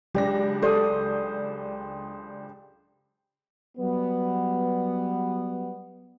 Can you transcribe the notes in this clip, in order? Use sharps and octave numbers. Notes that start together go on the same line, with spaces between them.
C#2 F#3 D4 G4 A#6
G4 A4 C5 D5 D#6
F#3 G3 B3